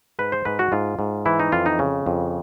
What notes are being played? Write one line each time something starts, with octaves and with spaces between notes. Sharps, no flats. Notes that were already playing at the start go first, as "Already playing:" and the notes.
G#2 B4
C5
G#2 B4
F#4
G#2 F4
G#2
E3 E4
D#4
F2 F4
D#4
C#3
F2